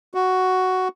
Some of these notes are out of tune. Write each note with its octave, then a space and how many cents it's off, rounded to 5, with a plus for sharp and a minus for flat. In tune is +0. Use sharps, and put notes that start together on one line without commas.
F#4 +5